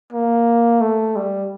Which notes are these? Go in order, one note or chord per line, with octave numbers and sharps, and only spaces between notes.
A#3
A3
G3